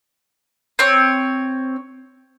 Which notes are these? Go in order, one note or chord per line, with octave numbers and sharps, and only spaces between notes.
C4 C#5